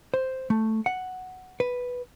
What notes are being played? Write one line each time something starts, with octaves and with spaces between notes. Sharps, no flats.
C5
A3
F#5
B4